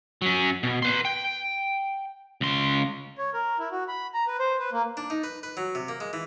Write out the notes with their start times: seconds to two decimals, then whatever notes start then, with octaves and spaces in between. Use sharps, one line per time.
0.22 F#3 C#4
0.63 B2
0.82 B4 C6
1.05 G5
2.41 C#2 C6
3.18 C#5
3.34 A#4
3.59 E4
3.72 F#4
3.88 B5
4.14 A#5
4.27 B4
4.39 C5
4.59 B4
4.72 A#3
4.97 D4
5.10 D#4
5.24 B4
5.43 B4
5.57 F#3
5.75 C3
5.88 A#3
6.00 G#3
6.13 E3